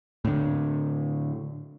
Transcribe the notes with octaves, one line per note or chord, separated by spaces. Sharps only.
A2 D3